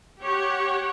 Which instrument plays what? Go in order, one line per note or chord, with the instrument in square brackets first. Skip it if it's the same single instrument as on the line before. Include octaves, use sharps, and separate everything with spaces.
[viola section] G4 C#5 F#5